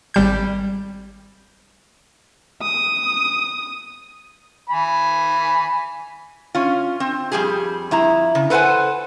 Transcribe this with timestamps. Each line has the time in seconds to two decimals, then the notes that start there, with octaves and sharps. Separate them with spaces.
0.14 G#1 G3 G6
2.62 D#6
4.70 G#5 B5
6.55 C#4 F4
7.00 C4
7.32 F2 F3 G3 G4 G#4
7.91 F2 E4 A#5
8.35 C#3
8.50 A4 B4 C5 F5 F#5 G#5